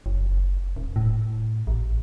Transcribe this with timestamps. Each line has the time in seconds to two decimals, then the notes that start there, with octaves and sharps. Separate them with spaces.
0.06 F#1
0.76 D#1
0.96 A2
1.67 A1